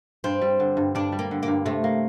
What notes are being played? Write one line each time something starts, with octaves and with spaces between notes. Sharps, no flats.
G2 C4
G3
D3
G2
G2 D4
G3
A#3
D3
A#3
G2
C3 A3
A#3